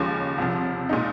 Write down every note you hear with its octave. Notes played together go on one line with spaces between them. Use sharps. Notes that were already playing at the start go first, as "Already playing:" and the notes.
Already playing: D#2 C#3 F3 G#3 C#4
C2 C3 F3
A#2 G#3 D#4